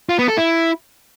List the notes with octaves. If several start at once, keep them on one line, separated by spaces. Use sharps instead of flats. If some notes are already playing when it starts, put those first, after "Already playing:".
F4
B3
A4
E4